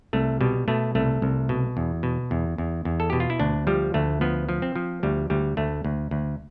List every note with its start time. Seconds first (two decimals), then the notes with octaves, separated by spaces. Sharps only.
0.13 C2 A3
0.41 B2 G3
0.68 B2 A3
0.95 C2 A3
1.22 C2
1.49 B2
1.77 E2
2.03 B2
2.31 E2
2.58 E2
2.85 E2
3.00 A4
3.10 B2 G4
3.20 F4
3.30 E4
3.40 D2 D4
3.67 F3 G3
3.94 D2 A3
4.21 F3 B3
4.49 F3
4.62 C4
4.76 F3
5.03 D2 G3
5.30 D2 G3
5.57 D2 A3
5.85 D2
6.11 D2